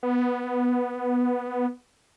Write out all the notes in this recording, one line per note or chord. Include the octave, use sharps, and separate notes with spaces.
B3